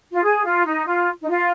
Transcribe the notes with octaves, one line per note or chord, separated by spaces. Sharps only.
F4
G#4
F4
D#4
F4
D#4
F4